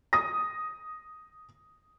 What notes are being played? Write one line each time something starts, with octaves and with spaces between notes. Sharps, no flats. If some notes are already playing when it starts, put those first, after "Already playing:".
D#6 A#6